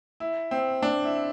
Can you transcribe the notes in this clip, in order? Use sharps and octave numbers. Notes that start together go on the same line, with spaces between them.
E4
C4
D4
E4